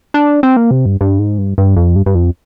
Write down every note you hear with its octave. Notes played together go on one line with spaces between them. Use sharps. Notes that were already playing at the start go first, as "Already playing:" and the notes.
D4
C4
A#3
C3
G2
G2
G#2
G2
G2
F2
G2
G2
F2